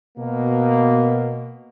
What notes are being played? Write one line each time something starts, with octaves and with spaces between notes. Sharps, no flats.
B2 A#3